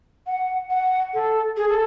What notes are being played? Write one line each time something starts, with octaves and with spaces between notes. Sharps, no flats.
F#5
F#5
A4
G#4
A4